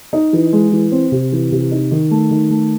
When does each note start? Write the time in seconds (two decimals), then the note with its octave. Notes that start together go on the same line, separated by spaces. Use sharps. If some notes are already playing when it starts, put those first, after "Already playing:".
0.13 D#4
0.33 E3
0.53 G#3
0.72 E3
0.92 C4
1.12 C3
1.32 E3
1.52 C3
1.71 D#4
1.91 D#3
2.11 A3
2.31 D#3
2.50 A3